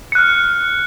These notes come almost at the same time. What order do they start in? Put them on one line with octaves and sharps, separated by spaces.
C#7 F#6 F6